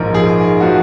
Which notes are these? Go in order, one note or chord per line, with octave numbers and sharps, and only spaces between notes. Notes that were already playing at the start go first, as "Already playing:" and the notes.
Already playing: A#1 G#2 F3 A#4
G#4
F3 F#4